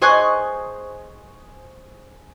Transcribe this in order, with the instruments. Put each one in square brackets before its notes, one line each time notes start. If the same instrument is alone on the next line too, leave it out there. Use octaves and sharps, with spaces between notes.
[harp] G#4 C5 D#5 G#5 C#6 F#6